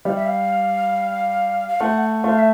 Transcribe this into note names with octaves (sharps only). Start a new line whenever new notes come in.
G3 F5
E5
F5
F5
A3 F#5
F#5
A3 F5
E5